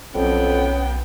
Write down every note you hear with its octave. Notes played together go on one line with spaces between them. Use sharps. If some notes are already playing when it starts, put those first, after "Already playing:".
B1 F2 B3 C#4 G5